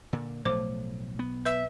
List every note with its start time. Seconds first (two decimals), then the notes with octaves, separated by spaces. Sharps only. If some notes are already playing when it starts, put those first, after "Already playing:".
0.13 A#2 D3
0.45 B1 A2 F3 A3 C5 D6
1.19 B3
1.45 B4 E5